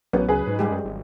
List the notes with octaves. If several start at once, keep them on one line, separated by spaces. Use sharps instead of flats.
A1 F#3 B3 C#4
C#2 G#4 B4
G#2
G3 G#3 G4
F#2
G#1